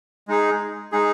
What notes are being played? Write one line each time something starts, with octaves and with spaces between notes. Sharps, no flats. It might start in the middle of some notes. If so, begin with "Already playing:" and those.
G#3 D#4 G#4
G#3 D#4 G#4